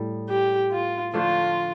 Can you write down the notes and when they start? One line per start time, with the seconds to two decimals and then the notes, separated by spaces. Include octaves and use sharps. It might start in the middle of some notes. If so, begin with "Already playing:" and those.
Already playing: A2 G3
0.29 G4
0.71 F4
1.14 D3 F3 A3 D4 F4